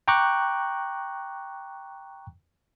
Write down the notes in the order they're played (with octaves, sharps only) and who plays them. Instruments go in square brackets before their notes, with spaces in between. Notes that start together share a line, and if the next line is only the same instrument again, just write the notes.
[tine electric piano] G5 A#5 C#6 D6 F#6